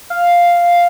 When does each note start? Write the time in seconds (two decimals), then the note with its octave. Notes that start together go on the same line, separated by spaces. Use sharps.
0.10 F5